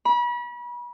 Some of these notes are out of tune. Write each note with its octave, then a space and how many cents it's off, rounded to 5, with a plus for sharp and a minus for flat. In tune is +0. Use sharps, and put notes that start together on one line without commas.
B5 -35